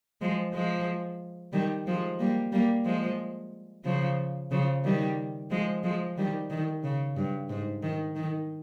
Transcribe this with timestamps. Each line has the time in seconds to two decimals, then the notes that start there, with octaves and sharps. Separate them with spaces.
0.21 F3 G#3
0.53 F3 G#3
1.53 D#3 G3
1.87 F3 G#3
2.19 G3 A#3
2.52 G3 A#3
2.85 F3 G#3
3.85 C#3 F3
4.51 C#3 F3
4.84 D#3 G3
5.50 F3 G#3
5.84 F3 G#3
6.17 D#3 G3
6.50 D#3
6.84 C#3
7.16 G2
7.49 G#2
7.83 D#3
8.16 D#3